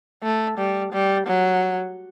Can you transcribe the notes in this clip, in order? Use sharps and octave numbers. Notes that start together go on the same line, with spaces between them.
A3
G3
G3
F#3